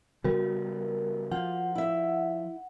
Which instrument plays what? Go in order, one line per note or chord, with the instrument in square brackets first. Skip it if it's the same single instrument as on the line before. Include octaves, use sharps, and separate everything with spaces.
[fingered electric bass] C#3 G3 B3 [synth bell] F#4 A#4
[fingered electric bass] F3 [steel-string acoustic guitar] F4 [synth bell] F#5
[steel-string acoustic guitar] E4 E5